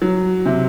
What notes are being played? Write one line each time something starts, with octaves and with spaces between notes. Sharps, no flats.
F#3
C3